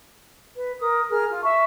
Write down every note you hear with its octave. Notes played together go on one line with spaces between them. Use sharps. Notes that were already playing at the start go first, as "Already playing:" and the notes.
B4
A#4 D#6
G#4 A#4 F6
F4
E5 A5 C#6